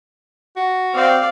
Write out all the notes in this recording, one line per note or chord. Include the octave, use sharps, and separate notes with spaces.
F#4
C4 D5 F5